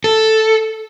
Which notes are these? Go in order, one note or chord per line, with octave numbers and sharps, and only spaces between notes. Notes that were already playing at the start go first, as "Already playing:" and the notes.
A4